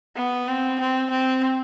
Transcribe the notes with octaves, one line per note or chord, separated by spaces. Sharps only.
B3
C4
C4
C4